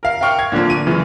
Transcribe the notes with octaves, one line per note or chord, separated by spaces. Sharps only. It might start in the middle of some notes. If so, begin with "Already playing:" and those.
A#4 F5
F5 G5 C#6 F6
G#6
A#2 D3 F3 A#3
D#7
F#2 C#3 E3